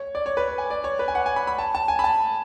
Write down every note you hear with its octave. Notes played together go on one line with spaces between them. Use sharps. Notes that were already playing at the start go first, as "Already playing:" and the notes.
Already playing: C#5
D5
C#5
B4
C#5
G#5
D5
C#5
B4
G#5
F#5
G#5
B5
B5
A5
A5
G#5
B5
A5